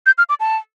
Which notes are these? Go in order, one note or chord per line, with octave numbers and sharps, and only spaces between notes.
G6
F6
D6
A5